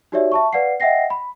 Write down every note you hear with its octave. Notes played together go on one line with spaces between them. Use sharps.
D#4 F#4 G4 C#5 D5 E5
E5 A5 C#6
B4 D5 F5 F#5 C7
D#5 E5 F#5 G5 A#6 C7
B5